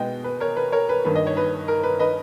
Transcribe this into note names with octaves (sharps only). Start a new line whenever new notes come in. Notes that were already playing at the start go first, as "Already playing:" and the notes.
Already playing: B2 G#3 B3 D#5 G5
B4
A#4 C#5
B4
A#4 C#5
B4
G2 D#3 A#3 B4
D#5
C#5
B4
A#4
B4
B4 D#5